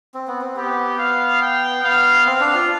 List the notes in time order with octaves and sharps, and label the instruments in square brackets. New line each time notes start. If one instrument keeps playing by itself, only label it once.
[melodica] C4
B3
C4
[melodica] B3 [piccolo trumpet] G4
[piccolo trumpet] F5
G5
[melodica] B3 [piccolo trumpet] F5
[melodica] C4 [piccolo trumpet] F5
[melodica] D4
F4